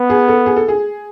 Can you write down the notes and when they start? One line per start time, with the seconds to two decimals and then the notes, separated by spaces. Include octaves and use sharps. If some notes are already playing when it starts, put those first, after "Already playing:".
Already playing: B3
0.10 G#4
0.28 A4
0.46 G#4
0.56 A4
0.68 G#4